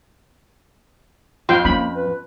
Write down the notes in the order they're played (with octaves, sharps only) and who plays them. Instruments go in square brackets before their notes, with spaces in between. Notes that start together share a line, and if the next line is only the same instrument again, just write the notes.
[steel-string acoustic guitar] F2 [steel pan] F4 G5 C6
[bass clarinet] A#3 [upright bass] C#4 [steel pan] B5
[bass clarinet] B4